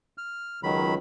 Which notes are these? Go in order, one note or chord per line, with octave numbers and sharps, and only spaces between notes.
F6
C#2 D#3 F#3 B5